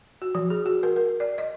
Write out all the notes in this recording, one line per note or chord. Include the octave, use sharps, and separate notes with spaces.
F#4
F3
G#4
F#4
A#4
A#4
D5
D#5